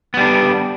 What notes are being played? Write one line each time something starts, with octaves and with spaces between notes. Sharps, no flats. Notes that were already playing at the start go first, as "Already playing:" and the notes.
G3 B3 D4